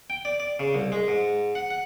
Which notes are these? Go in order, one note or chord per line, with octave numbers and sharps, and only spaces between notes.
G5
D5
D5
C#3
C2
G#3
G#2
F#5
F#5